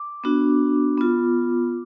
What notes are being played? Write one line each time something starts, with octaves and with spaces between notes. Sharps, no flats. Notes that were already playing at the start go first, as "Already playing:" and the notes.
Already playing: D6
B3 D4 F#4
B3 F4